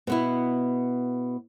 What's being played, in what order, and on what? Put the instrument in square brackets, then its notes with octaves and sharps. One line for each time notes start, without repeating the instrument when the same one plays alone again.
[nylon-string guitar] B2 B3 E4